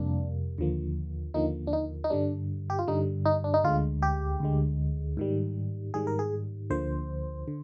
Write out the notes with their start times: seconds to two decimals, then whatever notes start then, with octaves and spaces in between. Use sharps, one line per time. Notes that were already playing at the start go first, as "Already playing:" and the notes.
Already playing: F2 C3 G3 A#3 D4
0.58 D#2 D3 F3 A#3
1.34 D#2 D3 F3 A#3 D#4
1.67 D4
1.73 D#4
2.04 D#4
2.10 G2 D3 G3 D4
2.70 G4
2.79 F4
2.88 G2 D3 G3 D#4
3.26 D#4
3.44 D4
3.54 D#4
3.64 D2 D3 G#3 F4
4.02 G4
4.40 D2 D3 G#3
5.17 G#2 D#3 G3
5.94 G#2 D#3 G3 G#4
6.07 A#4
6.19 G#4
6.70 D2 D3 F3 A#3 C5
7.48 D3